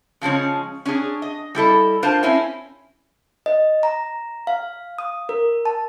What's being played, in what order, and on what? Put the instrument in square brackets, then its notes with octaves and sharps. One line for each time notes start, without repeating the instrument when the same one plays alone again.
[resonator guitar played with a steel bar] C#3 F3 G#3 C#4
C#4 D4 G#4
D#5
G3 E4 A4 D#5
D4 F4 A#4 C5 F5 A5
C4 C#4 E4 G#5
[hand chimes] D#5
A#5
F5
D#6
A#4
A5